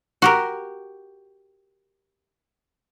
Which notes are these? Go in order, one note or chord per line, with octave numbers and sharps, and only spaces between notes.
F#4 G4 A#4